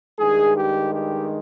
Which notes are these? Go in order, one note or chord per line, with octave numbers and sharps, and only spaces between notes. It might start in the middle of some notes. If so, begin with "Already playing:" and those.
G2 D#3 G#3 G#4
G4
G4